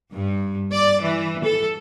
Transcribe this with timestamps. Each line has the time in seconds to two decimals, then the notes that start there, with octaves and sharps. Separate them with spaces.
0.12 G2
0.71 D5
1.01 E3
1.43 A4